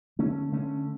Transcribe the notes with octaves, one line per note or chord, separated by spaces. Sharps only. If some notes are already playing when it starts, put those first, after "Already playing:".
D3 A3 C#4
D3 A3 C#4